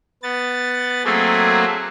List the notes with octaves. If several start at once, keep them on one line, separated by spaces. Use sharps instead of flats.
B3 A6
F#3 A3 A#3 C4 G#4 A4